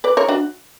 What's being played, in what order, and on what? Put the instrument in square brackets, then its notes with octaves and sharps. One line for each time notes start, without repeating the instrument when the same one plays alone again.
[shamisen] B4 D5
A#4 C#5
D4 F#4